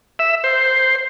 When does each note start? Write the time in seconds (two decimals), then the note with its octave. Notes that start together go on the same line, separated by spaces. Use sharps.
0.19 E5
0.44 C5